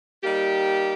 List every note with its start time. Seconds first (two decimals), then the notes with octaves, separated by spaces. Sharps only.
0.23 G3 A#3 D#4 G4